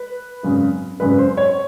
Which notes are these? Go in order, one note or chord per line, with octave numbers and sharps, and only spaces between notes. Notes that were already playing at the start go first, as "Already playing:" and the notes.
Already playing: B4
G#1 F#2 C#3
G#1 F#2 C#3 B4
C5
C#5